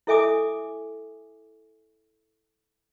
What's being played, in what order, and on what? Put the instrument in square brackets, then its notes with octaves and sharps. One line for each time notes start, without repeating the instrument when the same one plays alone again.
[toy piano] E4 A4 E5 G#5 D6 D#6